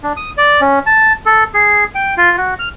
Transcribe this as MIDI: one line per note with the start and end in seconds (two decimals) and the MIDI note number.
0.03 0.13 62
0.17 0.31 87
0.38 0.61 74
0.61 0.79 61
0.86 1.13 81
1.26 1.44 69
1.54 1.84 68
1.95 2.14 79
2.17 2.36 65
2.37 2.54 66
2.59 2.69 89